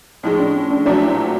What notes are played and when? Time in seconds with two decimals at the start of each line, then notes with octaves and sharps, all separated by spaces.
0.23 A2 F3 G#3 D#4
0.39 D4
0.55 C#4
0.70 D4
0.85 A#2 F#3 A3 C4 D4
1.02 E4
1.17 F#4